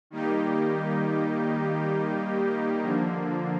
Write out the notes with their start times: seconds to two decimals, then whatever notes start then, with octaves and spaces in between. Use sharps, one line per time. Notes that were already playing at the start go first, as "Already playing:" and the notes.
0.10 D#3 G3 A#3 D#4 G4
2.83 D3 F3 A#3